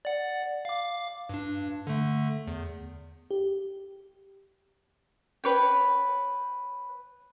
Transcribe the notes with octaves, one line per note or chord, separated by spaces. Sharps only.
D5 F#5
F5 D6
G2 D4
D3 A3
E2
G4
B4 C#5 G5